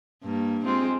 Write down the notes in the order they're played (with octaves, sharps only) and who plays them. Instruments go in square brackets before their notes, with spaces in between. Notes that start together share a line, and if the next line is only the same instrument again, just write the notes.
[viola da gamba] G2 A#3
G#3 C4 F4